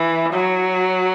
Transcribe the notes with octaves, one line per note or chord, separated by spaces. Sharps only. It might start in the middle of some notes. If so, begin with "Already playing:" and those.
Already playing: E3
F#3